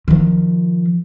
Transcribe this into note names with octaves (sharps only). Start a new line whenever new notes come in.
D#3 F3